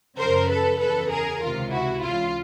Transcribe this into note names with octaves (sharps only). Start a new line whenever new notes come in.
F#2 C#3 F3 A#4 C5
A4 B4
E2 C#3 E3 A4 B4
G#4 A#4
C#2 C3 D#3 F4
E4 F#4
C#2 C#3 E3 F4